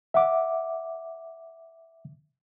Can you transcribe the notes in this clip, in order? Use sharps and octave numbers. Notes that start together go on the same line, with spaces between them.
E5 F#5 D6